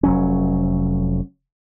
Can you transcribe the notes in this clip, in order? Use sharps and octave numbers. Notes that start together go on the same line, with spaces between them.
F1 F#3 C#4